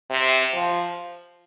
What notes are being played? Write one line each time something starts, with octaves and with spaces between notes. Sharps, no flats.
C3
F3